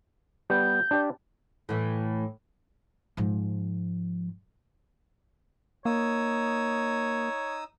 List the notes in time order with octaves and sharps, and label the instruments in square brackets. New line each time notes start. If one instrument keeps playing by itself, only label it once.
[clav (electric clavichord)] G3 B3 [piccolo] G6
[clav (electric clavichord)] D4 G4 D5
[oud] A2 E3
[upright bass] G#2 F3
[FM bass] A#3 [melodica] D#4 D#6 E6 [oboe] C#5